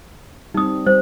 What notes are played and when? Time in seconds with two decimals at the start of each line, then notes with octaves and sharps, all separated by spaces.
0.54 G3 C4 D#4 D#6
0.86 G3 C5